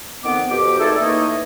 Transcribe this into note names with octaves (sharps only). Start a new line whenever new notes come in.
F2 D#3 B3 C4 D6
F2 B2 G4 A#4 D6
A#2 A3 D#4 G#4 A4
E3 A3 A#3 D#4 C#5 D#5